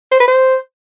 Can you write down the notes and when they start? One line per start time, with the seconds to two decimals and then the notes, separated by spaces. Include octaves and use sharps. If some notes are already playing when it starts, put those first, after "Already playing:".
0.11 C5
0.20 B4
0.28 C5